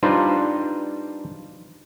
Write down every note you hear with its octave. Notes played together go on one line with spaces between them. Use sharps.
G3 D4 D#4 F4 B4 C5